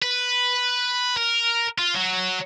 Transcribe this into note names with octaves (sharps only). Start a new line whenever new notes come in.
B4
A#4
F4
F#3